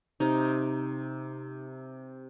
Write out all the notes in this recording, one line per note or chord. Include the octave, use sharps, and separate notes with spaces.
C3 D#4